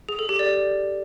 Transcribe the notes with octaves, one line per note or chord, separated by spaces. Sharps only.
G#4
A4
G4
D5